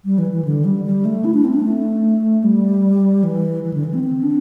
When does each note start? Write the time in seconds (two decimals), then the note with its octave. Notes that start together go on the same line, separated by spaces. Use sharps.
0.05 G3
0.18 E3
0.32 E3
0.45 D3
0.64 G3
0.85 G3
1.05 A3
1.25 E4
1.34 D4
1.45 C4
1.54 D4
1.64 A3
2.44 G3
3.24 E3
3.64 E3
3.74 D3
3.84 E3
3.94 C4
4.04 C4
4.23 D4